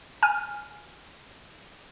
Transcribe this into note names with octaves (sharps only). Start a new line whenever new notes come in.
G#5 F6